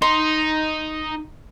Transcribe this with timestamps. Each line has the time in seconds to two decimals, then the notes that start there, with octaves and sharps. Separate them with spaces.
0.02 D#4 C6